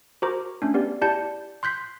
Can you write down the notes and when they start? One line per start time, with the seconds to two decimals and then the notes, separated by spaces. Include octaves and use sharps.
0.22 F#4 A#4 C5 A#5 D6
0.62 A3 C#4 D4
0.74 B3 G4 D5
1.02 E4 G4 D5 A5 G6 C#7
1.63 C6 F#6 G6 B6 C7